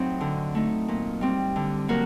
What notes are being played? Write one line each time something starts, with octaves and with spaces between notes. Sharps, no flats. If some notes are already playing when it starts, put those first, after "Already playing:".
Already playing: A2 F#3 C4 D#4 C5
D3
A3 D#4
A#2
G3 C4
D3
F#3 A#3 F#4 A#4